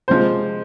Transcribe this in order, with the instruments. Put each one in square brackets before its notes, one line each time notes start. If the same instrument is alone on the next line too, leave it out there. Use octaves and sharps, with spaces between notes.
[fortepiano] C3 F3 G#3 [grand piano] C5